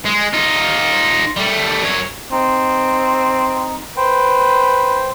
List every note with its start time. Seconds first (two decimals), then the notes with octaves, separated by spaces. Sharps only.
0.06 G#3
0.34 D#4 F4
1.36 G3 A3
1.83 F#2 C#5
2.32 C4 D#4
3.97 B4 C5 G5